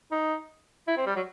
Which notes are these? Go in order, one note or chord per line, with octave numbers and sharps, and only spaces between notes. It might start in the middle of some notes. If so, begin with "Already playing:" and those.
D#4
E4
C4
G3
F#3